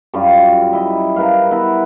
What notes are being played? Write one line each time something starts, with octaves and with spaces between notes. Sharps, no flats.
F#2 G3 F4 F5
E4 D#5
A#4 B4 F5
B3 E4 B4 A#5